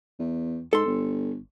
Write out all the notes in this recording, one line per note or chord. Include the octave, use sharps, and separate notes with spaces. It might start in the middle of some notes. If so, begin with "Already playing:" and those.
E2
G#2 A4 C6
G1